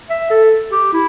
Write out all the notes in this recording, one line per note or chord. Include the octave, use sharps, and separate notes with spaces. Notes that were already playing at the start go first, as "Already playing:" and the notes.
E5
A4
G4
E4